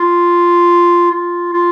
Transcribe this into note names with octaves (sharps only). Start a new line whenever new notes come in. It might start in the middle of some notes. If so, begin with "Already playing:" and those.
Already playing: F4
F4
F4